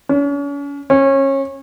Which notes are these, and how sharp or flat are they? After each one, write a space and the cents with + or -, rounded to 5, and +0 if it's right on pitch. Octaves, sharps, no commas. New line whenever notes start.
C#4 +40
C#4 -25